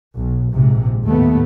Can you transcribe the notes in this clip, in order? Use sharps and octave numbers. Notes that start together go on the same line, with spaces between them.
B1
A#1 G#2 C3
D#2 A2 A3 B3